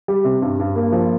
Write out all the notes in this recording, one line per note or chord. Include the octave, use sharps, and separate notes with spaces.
G3
C3
G2
G2
A#3
F3